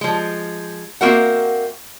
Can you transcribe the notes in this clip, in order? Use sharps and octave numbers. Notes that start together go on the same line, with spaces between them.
F3 G#3
A#3 C4 F#4 A#4 E5 F#5